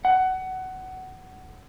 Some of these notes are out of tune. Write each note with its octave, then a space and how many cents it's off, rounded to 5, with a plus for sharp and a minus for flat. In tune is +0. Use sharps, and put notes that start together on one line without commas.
F#5 +20